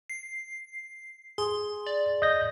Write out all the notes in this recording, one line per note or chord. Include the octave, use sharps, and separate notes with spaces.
C7
G#4 C6
D5
D#5 G6 A#6